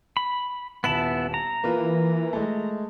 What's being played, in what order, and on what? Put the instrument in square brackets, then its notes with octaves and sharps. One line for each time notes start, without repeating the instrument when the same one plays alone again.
[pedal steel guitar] B5
[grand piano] D#1 E7 F#7 [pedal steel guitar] B3 E4 A5
[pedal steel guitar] A#5
[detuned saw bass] E3 [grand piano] A#3 F4 B4
[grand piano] G#3 A3